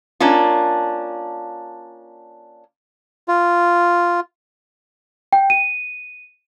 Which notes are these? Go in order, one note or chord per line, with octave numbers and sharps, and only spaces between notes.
A#3 C#4 D4 F4
F4
G5
D#7